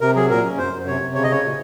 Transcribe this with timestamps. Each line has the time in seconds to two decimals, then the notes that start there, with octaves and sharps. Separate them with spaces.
0.01 C3 A#4
0.16 F#3 G#4
0.30 A#2 A#4
0.44 C#4
0.58 F#2 C5
0.73 F#2
0.86 C3 C#5
1.01 C3
1.14 C#3 C#5
1.24 D#5
1.29 C#3 C#5
1.43 A#2